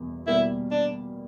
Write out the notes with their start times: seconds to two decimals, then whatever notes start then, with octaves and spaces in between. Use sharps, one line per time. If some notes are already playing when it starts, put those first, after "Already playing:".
Already playing: E2 B2 G3 A#3
0.27 B2 G3 A#3 E4
0.71 D4